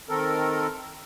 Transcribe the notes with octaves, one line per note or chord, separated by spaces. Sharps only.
D#3 C4 A4 A#4